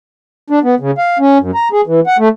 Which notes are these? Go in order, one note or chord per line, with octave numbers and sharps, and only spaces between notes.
D4
B3
C#3
F5
C#4
F#2
A#5
G#4
E3
F#5
A3